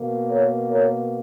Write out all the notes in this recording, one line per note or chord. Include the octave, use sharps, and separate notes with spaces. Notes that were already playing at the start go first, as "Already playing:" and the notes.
Already playing: B2 A#3
A#4 C#5
A#4 C#5